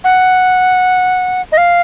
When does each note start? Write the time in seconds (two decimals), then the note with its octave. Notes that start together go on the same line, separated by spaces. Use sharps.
0.04 F#5
1.52 D#5
1.58 F5